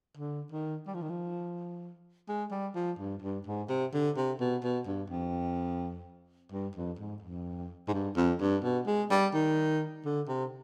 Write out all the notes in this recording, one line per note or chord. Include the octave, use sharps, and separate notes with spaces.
D3
D#3
G3
F3
D#3
F3
G#3
G3
F3
G2
G2
G#2
C3
D3
C3
B2
B2
G2
F2
G2
F2
G#2
F2
G#2
G2
F2
G2
B2
G#3
G3
D#3
D3
C3